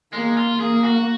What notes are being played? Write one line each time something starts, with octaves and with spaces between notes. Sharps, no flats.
G#3 A#3
F4
A#3 G#4
F#4